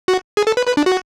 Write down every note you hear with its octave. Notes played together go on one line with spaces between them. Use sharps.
F#4
G#4
A4
B4
B4
D4
F#4